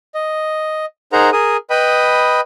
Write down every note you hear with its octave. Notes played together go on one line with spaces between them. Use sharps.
D#5
D#4 G#4 A#4 C5 F#5 A#5
G#4 A#4 D#6
B4 D#5 G5 B5 D#6